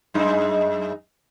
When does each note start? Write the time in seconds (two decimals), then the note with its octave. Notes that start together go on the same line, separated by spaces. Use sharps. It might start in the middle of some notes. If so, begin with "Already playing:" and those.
0.14 F#2 G#3 D#4